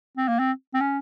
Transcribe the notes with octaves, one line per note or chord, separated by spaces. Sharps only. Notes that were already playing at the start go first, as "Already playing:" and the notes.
C4
A#3
C4
C4
C#4